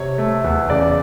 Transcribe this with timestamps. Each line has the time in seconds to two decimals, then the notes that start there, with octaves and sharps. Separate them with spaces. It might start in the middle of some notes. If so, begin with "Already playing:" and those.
Already playing: C3 C#5
0.18 A3
0.44 E2
0.70 C#3 D5